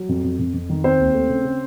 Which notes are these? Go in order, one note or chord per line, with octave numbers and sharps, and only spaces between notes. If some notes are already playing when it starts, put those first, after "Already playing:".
Already playing: F#3
F2
F2
F2
F2
D#3
C4 C5
D#2
A3
C#3
C#3